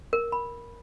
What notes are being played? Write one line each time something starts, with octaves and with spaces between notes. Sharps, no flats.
A#4
B5